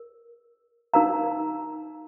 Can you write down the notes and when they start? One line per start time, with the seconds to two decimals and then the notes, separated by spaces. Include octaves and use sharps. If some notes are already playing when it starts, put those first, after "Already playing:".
Already playing: A#4
0.94 D#4 A#4 F5 A#5